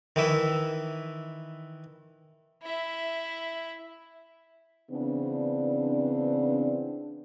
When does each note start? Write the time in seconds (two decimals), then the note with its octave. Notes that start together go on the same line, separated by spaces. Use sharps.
0.16 D#3 E3 E4
2.63 E4 E5
4.91 C#3 E3 B3 C4 D4